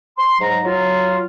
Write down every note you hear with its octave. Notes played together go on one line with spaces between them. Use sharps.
C6
G#2 F#3 A#5
F#3 F4